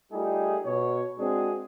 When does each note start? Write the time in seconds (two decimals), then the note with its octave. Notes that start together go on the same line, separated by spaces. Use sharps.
0.12 G3 A3 D#4 F4 G4 G#4
0.65 B2 C#5
1.18 G#3 C4 D4 F#4 G#4